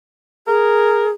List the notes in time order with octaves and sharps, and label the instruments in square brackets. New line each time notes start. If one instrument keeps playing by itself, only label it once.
[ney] G#4 [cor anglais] A#4